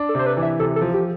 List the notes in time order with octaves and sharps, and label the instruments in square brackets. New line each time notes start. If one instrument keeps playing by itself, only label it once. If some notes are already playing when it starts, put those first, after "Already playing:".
Already playing: [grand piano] D4
[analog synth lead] A4
[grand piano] C3 [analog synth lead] C5
[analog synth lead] B4
[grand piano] E3
[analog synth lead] E5
[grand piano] C3 [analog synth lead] A4
[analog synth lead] A4
[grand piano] F3
[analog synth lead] G4